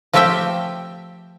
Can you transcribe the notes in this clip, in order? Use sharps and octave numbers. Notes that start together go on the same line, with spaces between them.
F3 A3 C4 G4 E5 G5